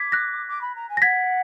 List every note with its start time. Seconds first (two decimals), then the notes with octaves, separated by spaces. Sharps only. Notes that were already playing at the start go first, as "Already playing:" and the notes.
Already playing: D6 G#6 B6
0.12 F#6 A#6
0.48 D6
0.61 B5
0.75 A#5
0.89 G#5
0.97 A#6
1.02 F#5 G#6 B6